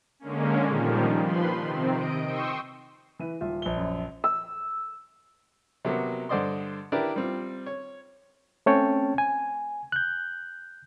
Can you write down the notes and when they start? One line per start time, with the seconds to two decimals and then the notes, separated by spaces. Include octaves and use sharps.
0.19 D3 G#3 A#3 C#4
0.65 A#2 D#3 F3 G3
1.24 F3 B4 B5 C6
1.60 C3 D#3 C4
1.93 D#5 D7
2.25 G5 C6 C#6 D#6 E6
3.19 E3 B4 D#7
3.41 D#1 F4 E5
3.62 A#1 G7
3.77 F#2
4.24 E6
5.85 C3 F#3 A#3 B3
6.29 G2 D3 C5 D5 D#5 C6
6.92 D4 E4 G4 A#4 B4 D5
7.16 G3 C4 F4
7.66 C#5
8.66 A3 C4 C#4 C#5 G5 A5
9.18 G#5
9.92 F#6 G6